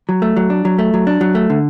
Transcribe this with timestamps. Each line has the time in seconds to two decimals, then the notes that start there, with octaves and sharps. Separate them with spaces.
0.09 F#3
0.22 A3
0.37 F#3
0.50 D4
0.65 F#3
0.79 A3
0.94 F#3
1.07 D4
1.21 F#3
1.35 A3
1.50 D3